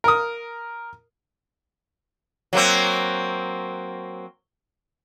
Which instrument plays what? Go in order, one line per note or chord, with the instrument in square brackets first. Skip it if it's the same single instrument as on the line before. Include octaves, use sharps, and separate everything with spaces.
[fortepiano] A#4 D#6
[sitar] F#3 A#3 C4